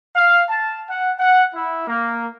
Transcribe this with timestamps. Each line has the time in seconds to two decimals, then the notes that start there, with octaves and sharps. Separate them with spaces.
0.16 F5
0.49 A5
0.88 F#5
1.19 F#5
1.53 E4
1.86 A#3